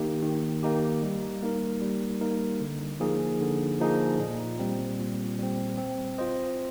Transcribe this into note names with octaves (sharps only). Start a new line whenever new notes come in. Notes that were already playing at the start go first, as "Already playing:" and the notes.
Already playing: D#3 A#3 D#4 G4
D#3
A#3 D#4 G4
G3
A#3 D#4 A#4
G3
A#3 D#4 A#4
D3
F3 A#3 D#4 G#4
D3
F3 A#3 D#4 G#4
A#2
G3 C4
A#2
G3 C4
C4
F4 C5 D#5